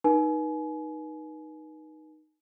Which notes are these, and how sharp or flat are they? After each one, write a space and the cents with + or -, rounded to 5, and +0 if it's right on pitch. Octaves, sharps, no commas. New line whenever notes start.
D#4 +0 B4 -40 G#5 +30